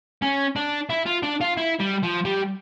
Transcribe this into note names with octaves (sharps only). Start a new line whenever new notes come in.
C#4
D4
E4
F4
D4
F4
E4
G3
F3
G3